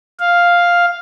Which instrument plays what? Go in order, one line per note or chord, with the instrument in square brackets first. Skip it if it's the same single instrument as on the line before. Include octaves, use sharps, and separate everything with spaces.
[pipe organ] F5